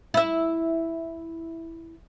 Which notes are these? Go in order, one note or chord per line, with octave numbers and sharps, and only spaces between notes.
E4 E5